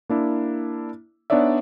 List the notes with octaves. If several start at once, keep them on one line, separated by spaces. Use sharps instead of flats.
A#3 D4 E4
B3 D4 D#4 C#5 D5 E5